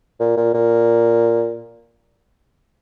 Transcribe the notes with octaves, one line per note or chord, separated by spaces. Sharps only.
A#2
A#2
A#2